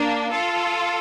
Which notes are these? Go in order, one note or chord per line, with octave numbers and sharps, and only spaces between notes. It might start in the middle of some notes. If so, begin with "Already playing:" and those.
Already playing: A#3 D4
F4 A4